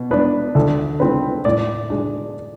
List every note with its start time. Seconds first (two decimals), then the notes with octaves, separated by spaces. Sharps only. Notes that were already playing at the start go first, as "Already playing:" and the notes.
Already playing: B2
0.11 B3 D4 B4
0.55 D2 A4
1.00 D3 G#3 C4 B4
1.45 A2 D5
1.90 G#3 D4